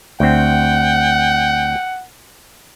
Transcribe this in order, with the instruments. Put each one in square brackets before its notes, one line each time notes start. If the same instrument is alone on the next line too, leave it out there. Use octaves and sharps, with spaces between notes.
[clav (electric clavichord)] D2 C4 [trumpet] F#5 [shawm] G5